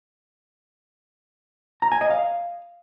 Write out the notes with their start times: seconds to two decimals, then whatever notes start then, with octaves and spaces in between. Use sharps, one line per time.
1.82 A#5
1.92 G#5
2.01 D#5
2.10 F5